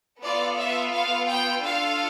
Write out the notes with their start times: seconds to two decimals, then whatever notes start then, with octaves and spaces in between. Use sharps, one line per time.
0.22 B3 F4 A4 D5
0.58 E5
0.93 F5
1.28 G5
1.63 D4 F4 A4 F5